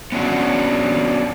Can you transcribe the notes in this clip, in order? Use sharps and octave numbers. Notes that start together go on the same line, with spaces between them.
B3 C#4 D4 E4 F#4